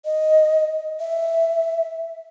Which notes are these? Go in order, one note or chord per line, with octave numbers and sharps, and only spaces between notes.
D#5
E5